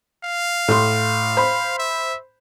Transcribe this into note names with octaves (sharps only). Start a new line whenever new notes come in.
F5
A2 C6
C5 B5
E5